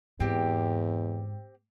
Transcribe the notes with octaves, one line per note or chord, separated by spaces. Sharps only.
E2 G#2 C4 G4